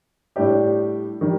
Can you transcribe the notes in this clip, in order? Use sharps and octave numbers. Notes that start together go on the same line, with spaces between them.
A2 G3 D4 G4
D#3 G3